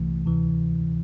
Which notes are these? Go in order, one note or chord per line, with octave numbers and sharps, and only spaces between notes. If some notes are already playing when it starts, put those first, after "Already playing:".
Already playing: C2 C3 E3 A3
D2 C3 E3